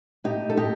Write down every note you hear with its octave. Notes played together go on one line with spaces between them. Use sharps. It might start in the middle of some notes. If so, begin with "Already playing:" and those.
A2 D#4 G4
A4
A2 D#4 G4